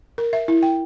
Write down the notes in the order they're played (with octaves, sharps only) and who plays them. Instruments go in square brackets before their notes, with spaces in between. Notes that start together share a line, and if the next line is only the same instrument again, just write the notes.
[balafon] A#4
E5
E4
G5